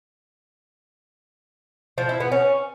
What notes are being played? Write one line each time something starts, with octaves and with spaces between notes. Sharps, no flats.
F3
E4
B3
C#4